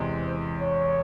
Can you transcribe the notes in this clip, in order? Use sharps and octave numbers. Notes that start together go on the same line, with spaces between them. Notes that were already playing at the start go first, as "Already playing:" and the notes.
Already playing: E2 C3 E3 G#3
C5
C#5